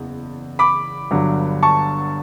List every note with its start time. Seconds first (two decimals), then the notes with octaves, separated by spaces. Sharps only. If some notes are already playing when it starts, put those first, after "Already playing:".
Already playing: F#1 E2
0.59 B5 D6
1.11 G1 G2 F#3
1.63 A5 C#6